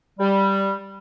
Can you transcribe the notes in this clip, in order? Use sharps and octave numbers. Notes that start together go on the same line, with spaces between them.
G3